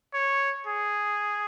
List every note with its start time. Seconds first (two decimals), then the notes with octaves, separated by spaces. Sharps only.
0.14 C#5
0.67 G#4